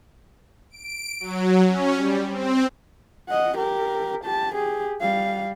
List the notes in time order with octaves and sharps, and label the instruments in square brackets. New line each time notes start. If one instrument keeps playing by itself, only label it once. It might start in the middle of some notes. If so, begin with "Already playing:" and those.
[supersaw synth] D7
F#3
C#4
G3
C4
[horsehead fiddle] D#5 F#5
G4 A#4
G4 A5
G4 G#4
G3 F5